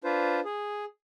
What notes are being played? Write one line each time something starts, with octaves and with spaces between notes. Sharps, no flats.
D4 F4 B4 C5
G#4